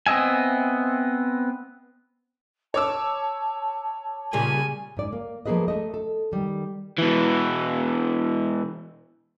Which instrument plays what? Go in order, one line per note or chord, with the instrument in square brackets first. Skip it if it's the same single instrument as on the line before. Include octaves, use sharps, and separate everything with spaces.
[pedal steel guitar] B3 C4 D#5 E5 G#5
[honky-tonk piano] C#5 D6 E6 [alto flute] A5
[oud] A#2 C#3 G3 [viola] G#5
[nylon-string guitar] G#2 D5
A#3
F3 A3 A#3 G#4 B4 D#5
A3 D#5
A4
D#3 G3
[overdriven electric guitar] B2 E3